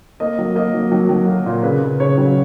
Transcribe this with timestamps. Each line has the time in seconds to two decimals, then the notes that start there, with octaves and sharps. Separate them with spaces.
0.20 A#3 D#5
0.39 F#3
0.55 A#3 D#5
0.74 F#3
0.92 F#3
1.09 F#3
1.28 A#3
1.46 A#2
1.63 C#3 B4
1.82 C#3
2.00 C#3 C#5
2.18 F#3